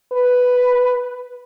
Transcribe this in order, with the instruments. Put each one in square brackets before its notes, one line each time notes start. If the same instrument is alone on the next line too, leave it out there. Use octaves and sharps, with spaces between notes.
[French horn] B4